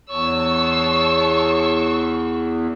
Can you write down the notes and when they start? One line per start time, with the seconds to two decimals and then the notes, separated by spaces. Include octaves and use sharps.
0.10 E2 C#5 A5 C#6 E6